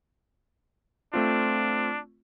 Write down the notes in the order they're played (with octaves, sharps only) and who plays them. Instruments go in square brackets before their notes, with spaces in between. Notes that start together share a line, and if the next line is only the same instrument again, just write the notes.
[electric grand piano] A3 C4 F4 [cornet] D4